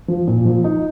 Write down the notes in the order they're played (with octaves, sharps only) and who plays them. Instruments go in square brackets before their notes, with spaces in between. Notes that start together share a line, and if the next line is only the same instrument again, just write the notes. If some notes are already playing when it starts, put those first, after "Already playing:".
[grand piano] F3
A#2
F3
D#4